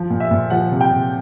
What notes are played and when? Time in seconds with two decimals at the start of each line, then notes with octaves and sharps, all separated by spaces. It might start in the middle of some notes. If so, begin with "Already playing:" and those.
Already playing: F3
0.10 A#2
0.20 E5
0.31 A#2
0.50 F3 F#5
0.71 C3
0.81 G5
0.91 C3